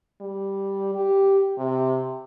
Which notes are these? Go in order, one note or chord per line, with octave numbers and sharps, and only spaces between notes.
G3
G4
C3